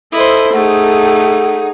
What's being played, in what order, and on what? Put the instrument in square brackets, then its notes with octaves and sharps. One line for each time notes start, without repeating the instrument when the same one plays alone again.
[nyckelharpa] E4 C5 [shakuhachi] A4 [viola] D#5
[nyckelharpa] A3 [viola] D#4 G#4 [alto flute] F#5